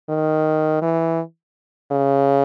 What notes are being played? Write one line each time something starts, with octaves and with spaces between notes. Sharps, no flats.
D#3
E3
C#3